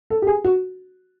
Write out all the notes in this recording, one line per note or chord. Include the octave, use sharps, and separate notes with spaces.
A4
G4
G#4
F#4